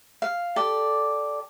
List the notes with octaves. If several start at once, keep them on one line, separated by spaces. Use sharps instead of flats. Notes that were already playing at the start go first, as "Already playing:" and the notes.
F5
G4 A4 D5